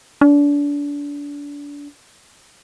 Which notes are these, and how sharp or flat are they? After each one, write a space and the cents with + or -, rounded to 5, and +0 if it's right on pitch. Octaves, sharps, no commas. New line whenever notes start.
D4 -30